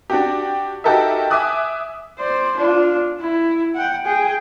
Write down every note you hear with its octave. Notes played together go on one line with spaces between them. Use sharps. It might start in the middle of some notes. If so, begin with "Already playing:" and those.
D4 F#4 G4
D#4 F#4 G4 A4 A#4 E5
E5 G#5 D6 D#6 F#6
C5 D5
D4 F4
E4
F#5 G5
G#4 G5